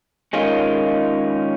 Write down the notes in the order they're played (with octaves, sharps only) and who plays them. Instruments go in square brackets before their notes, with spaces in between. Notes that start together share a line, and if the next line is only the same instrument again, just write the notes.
[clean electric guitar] D#3 G#3 C#4 F4